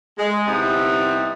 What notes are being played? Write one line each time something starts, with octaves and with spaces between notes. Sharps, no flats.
G#3
C3 G3 B3 C4 D#4 E4